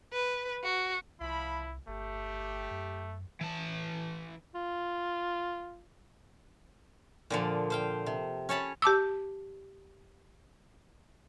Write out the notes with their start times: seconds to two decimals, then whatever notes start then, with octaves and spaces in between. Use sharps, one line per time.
0.12 B4
0.63 F#4
1.21 C2 F3 E4 B5
1.88 G1 A3 G4
2.71 F#2
3.41 E3 A5
4.54 F4
7.30 A#2 D3 F3
7.70 C5 F5 G5
8.06 C3
8.49 C#4 C#5 A5 B5
8.82 G4 A5 D6 E6